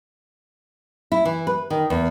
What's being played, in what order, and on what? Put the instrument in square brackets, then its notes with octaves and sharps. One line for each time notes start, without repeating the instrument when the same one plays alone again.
[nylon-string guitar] E4
E3
B4
D#3
E2